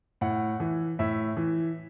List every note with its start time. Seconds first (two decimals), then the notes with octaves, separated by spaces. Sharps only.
0.21 A2 F#5
0.60 E3
0.99 A2 E5
1.37 E3